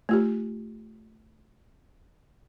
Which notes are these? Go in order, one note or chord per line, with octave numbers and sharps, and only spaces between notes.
A3 F4 G4